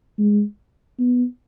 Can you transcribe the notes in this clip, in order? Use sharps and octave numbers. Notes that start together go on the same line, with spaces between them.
G#3
B3